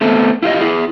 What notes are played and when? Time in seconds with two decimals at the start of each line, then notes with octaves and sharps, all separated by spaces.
0.01 A3 B3 C4 A4
0.43 E4 F4 G4 D#5
0.61 E4 G#4